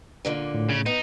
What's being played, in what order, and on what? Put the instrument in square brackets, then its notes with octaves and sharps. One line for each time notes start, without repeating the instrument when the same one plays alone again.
[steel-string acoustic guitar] A#2 D3 A#3
[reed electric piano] A2
[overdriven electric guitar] C#3
[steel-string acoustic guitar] B3 [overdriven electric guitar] D#4